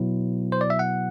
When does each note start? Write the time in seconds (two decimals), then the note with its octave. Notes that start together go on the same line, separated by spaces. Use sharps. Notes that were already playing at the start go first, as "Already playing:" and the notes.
Already playing: B2 F#3 B3 E4
0.52 C5
0.61 D5
0.70 E5
0.79 F#5